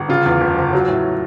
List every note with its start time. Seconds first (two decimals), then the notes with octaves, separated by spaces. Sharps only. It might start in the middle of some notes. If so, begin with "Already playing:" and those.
Already playing: G1
0.09 C#3 F4
0.26 E2
0.41 F#1
0.57 F#1
0.73 F#3
0.88 A2